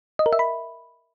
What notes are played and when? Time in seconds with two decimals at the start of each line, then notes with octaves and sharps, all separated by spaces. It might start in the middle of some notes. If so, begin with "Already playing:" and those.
0.19 D#5
0.26 A#4
0.33 E5
0.39 B5